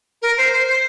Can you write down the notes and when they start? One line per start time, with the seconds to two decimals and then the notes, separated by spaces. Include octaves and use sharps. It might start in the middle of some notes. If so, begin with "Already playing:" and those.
0.22 A#4
0.38 C5
0.53 C5
0.68 C5